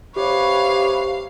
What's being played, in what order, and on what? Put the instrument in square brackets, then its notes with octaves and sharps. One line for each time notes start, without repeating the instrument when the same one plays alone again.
[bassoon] C3 [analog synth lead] G4 [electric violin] B4 C#5 [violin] F5